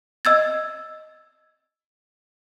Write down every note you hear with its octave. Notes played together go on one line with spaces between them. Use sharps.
D#5 E6 G#6 A6